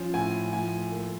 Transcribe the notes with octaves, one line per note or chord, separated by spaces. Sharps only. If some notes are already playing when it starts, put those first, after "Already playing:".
Already playing: F3 C#4
A2 G#5
F3 G#5
A#3